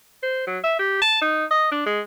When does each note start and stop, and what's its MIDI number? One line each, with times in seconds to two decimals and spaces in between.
0.23 0.46 72
0.47 0.59 54
0.64 0.76 76
0.79 0.98 67
1.02 1.17 81
1.21 1.45 63
1.51 1.71 75
1.72 1.84 62
1.86 2.01 56